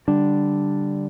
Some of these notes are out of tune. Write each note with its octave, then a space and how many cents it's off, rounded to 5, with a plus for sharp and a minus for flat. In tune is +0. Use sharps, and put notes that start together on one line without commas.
D3 +0 G3 +0 D4 +0